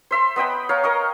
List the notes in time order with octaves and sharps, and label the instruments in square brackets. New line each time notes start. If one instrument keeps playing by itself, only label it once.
[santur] C5 E5 C6
B3 D#5 G5 B5
C#5 F5 A#5
A#4 D#5 C#6